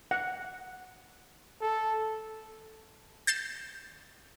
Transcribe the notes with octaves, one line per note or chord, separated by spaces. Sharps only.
F#5
A4
G6 A6 C7 E7